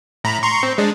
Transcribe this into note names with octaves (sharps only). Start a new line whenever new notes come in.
A2 A#5 B5
A#5 C6 C#6
C4
G#3 D4